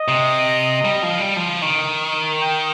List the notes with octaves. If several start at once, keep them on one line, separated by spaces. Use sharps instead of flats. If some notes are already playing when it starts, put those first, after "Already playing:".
Already playing: D#5
C3
G3
F3
G3
F3
D#3
G5